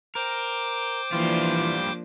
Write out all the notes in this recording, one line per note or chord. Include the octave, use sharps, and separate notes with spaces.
A#4 C5 G5 D6
E3 F3 G3 A#3 D4 F4